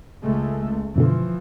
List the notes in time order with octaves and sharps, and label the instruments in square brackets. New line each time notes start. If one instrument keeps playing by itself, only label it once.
[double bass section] C#2 G#3 A3
[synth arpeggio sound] F#2 B2 D3 [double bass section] E3 F3